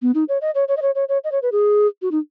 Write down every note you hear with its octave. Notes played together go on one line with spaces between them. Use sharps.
B3
D#4
C#5
D#5
C#5
C#5
D#5
C#5
C#5
C#5
D#5
C#5
B4
G#4
F#4
D#4